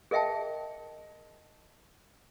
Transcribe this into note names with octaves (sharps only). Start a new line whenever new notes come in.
G#4 A#4 D#5 E5 G5 A5